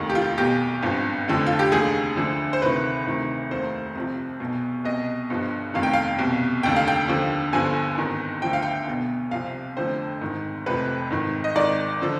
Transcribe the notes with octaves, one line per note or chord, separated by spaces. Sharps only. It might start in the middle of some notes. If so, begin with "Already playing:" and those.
Already playing: F1 D#2 D#3
G4
F4
B1 B2 G4
G#1 G2 F3
F1 F2 D3 F3
F4
G4
F1 D#2 D3 G#4
D2 D3 F3
C5
D2 C3 D#3 B4
D2 C3 D#3
F1 D#2 D#3 C5
C2 C3 F3
B1 B2
C2 B2 D#5
G1 G2 F3
F1 F2 D#3 F5
G5
F5
C2 B2
F1 D#2 D3 G5
F5
G5
D#2 D3 F3
G1 G2 D3 F3 G#5
G#1 G#2 D#3
D2 D3 F3 G5
F5
G5
B1 B2
C2 C3 F3 F5
F1 F2 D3 F3 C5
G#1 G#2 D#3
F1 F2 C3 F3 B4
G#1 G#2 D#3
D#5
G#1 G#2 D#3 D5
D3 F3